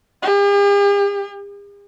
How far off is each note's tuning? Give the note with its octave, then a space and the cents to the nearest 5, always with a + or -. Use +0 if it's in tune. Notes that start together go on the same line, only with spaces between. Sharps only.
G4 +45